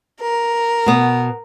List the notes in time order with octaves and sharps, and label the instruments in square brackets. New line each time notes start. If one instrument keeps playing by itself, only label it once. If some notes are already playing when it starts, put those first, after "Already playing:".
[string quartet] A#4
[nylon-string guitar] B2 B3